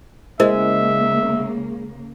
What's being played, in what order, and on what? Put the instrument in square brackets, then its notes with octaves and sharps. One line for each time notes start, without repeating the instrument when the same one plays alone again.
[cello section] C#3 A#3 [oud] G#3 [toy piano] E4 A#4 C5 [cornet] E5